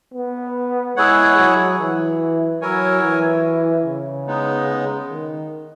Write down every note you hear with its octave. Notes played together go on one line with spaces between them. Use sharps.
B3
G#3 E4 G#4 C#5 F#5
F#3
E3
F#3 E4 A#4 C#5 G#5
E3
C#3
G#3 B3 D#4
D#3